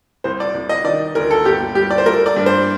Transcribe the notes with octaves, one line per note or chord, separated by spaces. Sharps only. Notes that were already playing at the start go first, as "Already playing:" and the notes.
C2 C5
D5
C2
D#5
D#3 D5
D2 A#4
A4
G1 G4
G3 G4
D5
C5
A3 A#4
D5
G2
C5